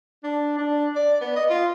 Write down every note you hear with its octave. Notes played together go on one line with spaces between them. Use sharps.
D4
D4
D5
B3
D#5
F4